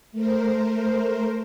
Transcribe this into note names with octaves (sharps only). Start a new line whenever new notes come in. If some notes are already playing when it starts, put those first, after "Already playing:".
A3 A#4 C5